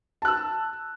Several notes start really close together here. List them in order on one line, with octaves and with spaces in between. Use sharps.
A5 F#6 E6